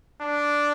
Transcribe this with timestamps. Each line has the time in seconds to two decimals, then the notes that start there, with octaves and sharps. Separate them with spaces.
0.21 D4